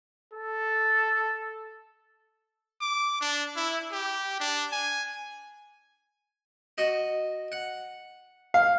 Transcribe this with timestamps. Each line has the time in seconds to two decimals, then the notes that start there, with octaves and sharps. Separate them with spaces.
0.33 A4
2.81 D6
3.21 D4
3.57 E4
3.92 G4
4.40 D4
4.72 G#5
6.78 F#4 D#5
7.52 F#5
8.54 F5